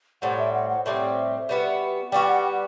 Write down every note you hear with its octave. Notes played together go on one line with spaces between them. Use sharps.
A2 G3 C4 F#5
E5
F#5
F#5
A2 G3 C4 E5
G3 B3 F#4
G3 B3 F#4 G5
G5
F#5